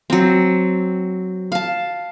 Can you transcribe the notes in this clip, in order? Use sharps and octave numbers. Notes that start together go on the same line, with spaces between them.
F#3 C4
F5 A5